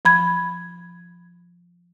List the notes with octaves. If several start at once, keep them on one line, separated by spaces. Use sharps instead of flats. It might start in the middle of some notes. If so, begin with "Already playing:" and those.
F3 B5 G#6